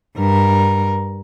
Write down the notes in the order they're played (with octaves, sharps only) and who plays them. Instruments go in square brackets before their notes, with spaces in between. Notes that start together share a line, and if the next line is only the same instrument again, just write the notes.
[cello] G2 A#4